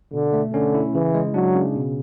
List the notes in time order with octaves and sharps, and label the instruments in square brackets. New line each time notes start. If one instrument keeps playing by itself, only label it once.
[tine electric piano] B2 [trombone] D3
[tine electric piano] A3
[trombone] D3 [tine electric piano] C#4
[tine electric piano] E4
[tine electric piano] C#3 [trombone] E3
[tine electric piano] G#3
[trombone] F#3 [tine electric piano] D4
[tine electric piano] C#3
B2